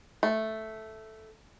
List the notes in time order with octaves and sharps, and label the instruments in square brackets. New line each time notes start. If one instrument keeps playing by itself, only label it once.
[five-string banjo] A3